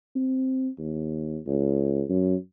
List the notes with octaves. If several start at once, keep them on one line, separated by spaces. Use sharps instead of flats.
C4
D#2
C#2
F#2